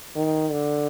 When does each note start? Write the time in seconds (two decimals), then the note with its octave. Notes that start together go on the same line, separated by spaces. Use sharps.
0.15 D#3
0.51 D3